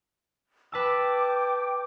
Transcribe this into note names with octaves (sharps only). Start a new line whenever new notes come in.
B4 G5 A5 D6 E6